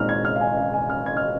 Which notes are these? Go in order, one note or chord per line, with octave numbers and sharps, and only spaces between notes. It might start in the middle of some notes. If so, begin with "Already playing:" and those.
Already playing: A#2 G#3 C4 D#4 F6
G#6
F6
F5
G#5
F5
G#5
F6
G#6
F6